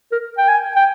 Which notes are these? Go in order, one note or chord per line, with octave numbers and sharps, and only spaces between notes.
A#4
G5
G#5
G5